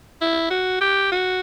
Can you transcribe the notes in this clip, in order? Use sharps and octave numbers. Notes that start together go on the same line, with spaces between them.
E4
F#4
G4
F#4